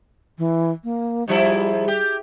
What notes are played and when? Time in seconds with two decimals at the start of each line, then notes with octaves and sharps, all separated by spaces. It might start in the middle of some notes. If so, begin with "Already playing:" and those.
0.38 E3
0.84 A#3
1.28 G#2 F3 G3 E4
1.88 G4